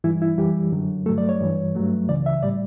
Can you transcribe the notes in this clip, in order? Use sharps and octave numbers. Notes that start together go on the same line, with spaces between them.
G2 E3 G3 E4
E4
F#2 E3 G3 G4
F#2 D3 F#3
G2 F#3 A3 A4
D5
C#5
G2 E3 G3
G2 F#3 A3
C#2 C#3 E3 D5
E5
A2 G3 D5